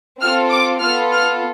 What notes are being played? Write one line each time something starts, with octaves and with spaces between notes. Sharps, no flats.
C4 F4 A4 F6
D6
B3 F4 A4 F6
F6